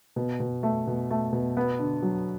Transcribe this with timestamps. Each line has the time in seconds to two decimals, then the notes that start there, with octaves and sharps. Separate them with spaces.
0.16 B2
0.40 B2
0.63 A3
0.87 B2
1.10 A3
1.33 B2
1.57 B3
1.79 D3
2.03 F#3